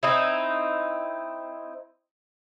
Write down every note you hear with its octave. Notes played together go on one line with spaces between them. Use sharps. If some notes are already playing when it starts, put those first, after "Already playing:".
C4 D#4 E4